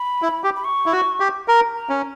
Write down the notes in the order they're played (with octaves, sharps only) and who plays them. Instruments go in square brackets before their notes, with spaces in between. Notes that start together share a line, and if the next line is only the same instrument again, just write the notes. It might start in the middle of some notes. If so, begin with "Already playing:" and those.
Already playing: [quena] B5
[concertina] E4
G4
[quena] B5
C#6
[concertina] E4
F#4
G4
A#4
[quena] A#5
[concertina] C#4